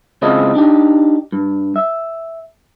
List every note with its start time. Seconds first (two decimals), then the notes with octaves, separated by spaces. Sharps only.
0.22 C#2 C#3 C4 E4 F4 D#5
0.55 D4 D#4 G4
1.32 G2
1.76 E5